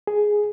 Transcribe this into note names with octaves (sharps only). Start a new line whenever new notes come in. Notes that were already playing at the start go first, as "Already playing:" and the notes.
G#4